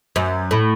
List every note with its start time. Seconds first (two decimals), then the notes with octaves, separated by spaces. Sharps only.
0.16 F#2
0.51 A2